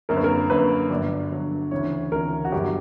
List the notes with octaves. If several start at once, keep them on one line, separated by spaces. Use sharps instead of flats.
F#2 D3 A#3 C#4 A#4
B4
A#4
F#2 D3 A#3 C#4 B4
G1 G2 D3 F#3 D5
G1 G2 D3 F#3
D2 C#3 E3 C#5
D2 C#3 E3 A#4
F#4
G1 G2 D3 F#3 G4